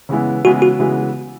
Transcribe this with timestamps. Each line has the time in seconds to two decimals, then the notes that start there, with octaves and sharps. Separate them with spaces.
0.09 C#3 E3 G#3 B3 E4
0.45 C#3 E3 G#3 B3 E4 F#4
0.62 F#4
0.79 C#3 E3 G#3 B3 E4